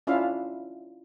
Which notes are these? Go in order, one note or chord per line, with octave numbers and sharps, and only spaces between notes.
C#4 D4 E4 F4 E5 F5